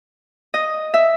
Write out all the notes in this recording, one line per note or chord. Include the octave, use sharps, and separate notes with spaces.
D#5
E5